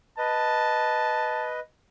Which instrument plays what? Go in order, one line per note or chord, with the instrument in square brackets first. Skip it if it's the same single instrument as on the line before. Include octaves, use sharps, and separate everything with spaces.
[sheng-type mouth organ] B4 D#5 [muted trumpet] A5